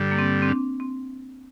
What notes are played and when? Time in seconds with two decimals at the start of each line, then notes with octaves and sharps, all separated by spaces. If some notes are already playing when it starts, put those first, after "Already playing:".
Already playing: G2 D3 G3
0.12 A#3
0.19 C4
0.42 C4
0.49 D4
0.80 C4